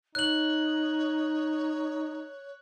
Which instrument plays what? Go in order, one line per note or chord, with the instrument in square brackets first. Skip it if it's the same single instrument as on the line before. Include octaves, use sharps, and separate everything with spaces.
[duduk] D#4 [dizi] C#5 [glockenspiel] F#6 F#7